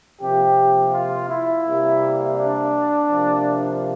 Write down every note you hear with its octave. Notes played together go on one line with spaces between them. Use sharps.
C3 F3 A#3 G4
F4
E4
C3 G3 A#3
D4
C3 F3 A#3